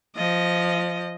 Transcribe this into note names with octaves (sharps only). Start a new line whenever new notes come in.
F3 D#5